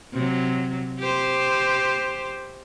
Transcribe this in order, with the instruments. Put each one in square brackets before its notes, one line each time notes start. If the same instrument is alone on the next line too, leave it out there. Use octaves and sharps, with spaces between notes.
[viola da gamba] C3 F#3
G4 C5